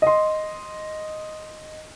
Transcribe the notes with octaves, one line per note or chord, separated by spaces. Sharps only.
D#5 C6